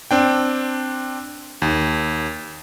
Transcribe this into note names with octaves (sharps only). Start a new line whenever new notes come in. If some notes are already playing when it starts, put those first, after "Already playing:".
C4 D4 G5
D#2